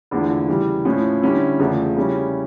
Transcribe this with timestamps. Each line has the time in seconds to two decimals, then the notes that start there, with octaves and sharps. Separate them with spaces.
0.11 E2 D3 F3 A3 E4
0.48 C#3 E3 G3
0.85 A2 F3 C#4 E4
1.22 D3 G3 C#4 E4
1.59 E2 C#3 F3 A3
1.97 C#3 G3 C#4 E4